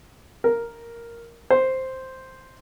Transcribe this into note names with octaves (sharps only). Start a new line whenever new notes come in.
A#4
C5